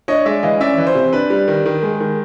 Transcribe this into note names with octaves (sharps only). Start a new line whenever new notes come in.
D4 C#5 D#5
G#3 D5 E5
E3 D#5 F5
C#4 D5 E5
E3
C5
C3
D4 B4
G3
D#3
D#3
G#3
D#3